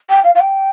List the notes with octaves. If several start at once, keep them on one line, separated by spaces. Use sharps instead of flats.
G5
F5
F5
G5